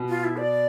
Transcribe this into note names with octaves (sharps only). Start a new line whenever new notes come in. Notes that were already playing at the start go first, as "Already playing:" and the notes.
Already playing: B2
F4
E4
D5